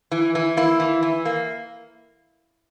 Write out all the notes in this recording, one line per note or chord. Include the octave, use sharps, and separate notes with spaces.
E3
E3
A#3 E4
E3
E3
A#3